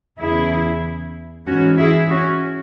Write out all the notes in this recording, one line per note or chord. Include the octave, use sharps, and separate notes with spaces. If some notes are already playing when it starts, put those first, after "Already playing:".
E2 C#3 E3 E4 G#4
G#2 E3 C#4 F#4
E4 G#4
C#4 F#4